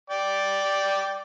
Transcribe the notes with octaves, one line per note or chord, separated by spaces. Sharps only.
D5 G5 D6